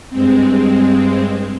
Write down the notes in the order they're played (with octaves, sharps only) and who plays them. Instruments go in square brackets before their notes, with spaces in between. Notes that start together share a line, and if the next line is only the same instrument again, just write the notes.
[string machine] G2 G#3 C4